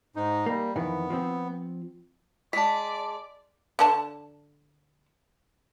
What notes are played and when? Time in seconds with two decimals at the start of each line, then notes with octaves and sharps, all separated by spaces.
0.16 G#2 D#4
0.46 G3 A#3
0.76 F2 D#3 E3 B3
1.10 F3 C4
2.53 G#3 D5 A5 B6
3.79 D3 D4 A5